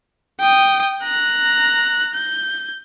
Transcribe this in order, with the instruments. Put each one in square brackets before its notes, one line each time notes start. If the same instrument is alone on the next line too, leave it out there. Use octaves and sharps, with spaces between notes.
[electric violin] G5 D#6
A#5 F#6
G6